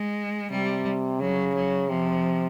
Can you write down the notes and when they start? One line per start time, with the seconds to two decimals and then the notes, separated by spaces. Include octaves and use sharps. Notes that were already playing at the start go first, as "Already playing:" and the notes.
Already playing: G#3
0.50 C3 G3
1.20 C#3 F#3
1.55 F#3
1.90 C3 F3